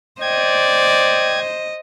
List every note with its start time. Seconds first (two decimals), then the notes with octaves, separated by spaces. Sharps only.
0.21 C5 D5 D#5 G5 G#6